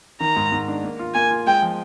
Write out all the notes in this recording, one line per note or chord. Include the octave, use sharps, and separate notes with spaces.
D#3 A#5
G#2
G#2
D4
A#3
F4
A#3 G#5
F4
G#3 G5
F3